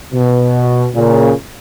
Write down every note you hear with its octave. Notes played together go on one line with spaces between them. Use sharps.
B2
A#2 C#3